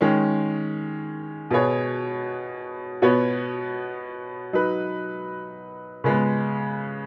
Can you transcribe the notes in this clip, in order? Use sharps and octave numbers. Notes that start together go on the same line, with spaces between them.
D#3 G#3 C#4
B2 B3 G#4 C#5
B2 B3 F#4 C#5
F#3 D#4 B4
C#3 G#3 B3